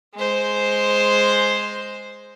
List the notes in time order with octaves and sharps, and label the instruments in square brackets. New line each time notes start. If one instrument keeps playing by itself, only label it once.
[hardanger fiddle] G#3 C5